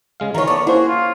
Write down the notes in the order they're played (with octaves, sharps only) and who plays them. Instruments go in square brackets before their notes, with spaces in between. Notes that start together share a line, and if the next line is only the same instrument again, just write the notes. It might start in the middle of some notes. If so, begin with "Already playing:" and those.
[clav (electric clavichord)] C#3 G#3 F5
[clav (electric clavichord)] D#3 E3 [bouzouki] F4 C#5 [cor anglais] A#4
[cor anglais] A3 [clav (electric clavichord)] B3 D5 [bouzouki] C#5
[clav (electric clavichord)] A#3 C#4 [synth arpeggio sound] E4 C5 [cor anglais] F#4 [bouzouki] G#4
[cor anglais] F4